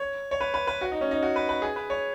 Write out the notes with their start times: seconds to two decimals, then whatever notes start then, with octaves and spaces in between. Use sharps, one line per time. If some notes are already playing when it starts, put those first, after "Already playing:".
Already playing: C#5
0.31 C#5
0.41 B4
0.54 B4
0.67 B4
0.81 F#4
0.92 D#4
1.01 C#4
1.11 D#4
1.23 F#4
1.36 B4
1.49 B4
1.62 G#4
1.76 B4
1.90 C#5